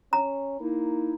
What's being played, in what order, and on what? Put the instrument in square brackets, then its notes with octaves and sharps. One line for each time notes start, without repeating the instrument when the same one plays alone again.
[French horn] C#4 [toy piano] A#5
[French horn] A#3 [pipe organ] D#4 E4